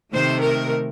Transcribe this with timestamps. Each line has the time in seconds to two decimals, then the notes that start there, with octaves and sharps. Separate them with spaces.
0.13 C3 D#3 A3 C5
0.42 A#4